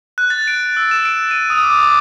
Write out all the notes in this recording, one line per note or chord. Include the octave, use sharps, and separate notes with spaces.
F#6
A6
D7
E6
E7
D7
D#7
D#6
D6
D6